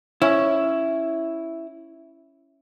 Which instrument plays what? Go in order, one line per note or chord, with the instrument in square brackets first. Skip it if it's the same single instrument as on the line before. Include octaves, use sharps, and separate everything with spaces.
[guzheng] C#4 [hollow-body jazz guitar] E4